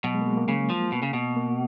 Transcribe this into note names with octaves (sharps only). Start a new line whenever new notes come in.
B2 F#3
G#3
A#3
G#3
A#3
C#3
F3
B2
C#3
B2
A#3